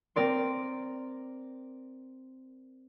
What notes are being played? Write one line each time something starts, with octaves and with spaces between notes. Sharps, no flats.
C4 A#4 D5 C6